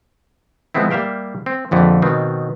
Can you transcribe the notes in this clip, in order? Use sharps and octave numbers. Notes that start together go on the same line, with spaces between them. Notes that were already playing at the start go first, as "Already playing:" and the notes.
F3 G#3 A3 B3 C4 E4
G3 A#3 E5 F5 G5
C4
A#1 F2 D3 A3
B2 D#3 B3 C4